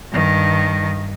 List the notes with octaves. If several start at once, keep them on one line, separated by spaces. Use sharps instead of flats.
G2 D#3